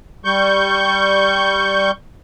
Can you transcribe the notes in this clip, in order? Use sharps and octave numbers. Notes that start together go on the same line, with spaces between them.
G3 C#6 G6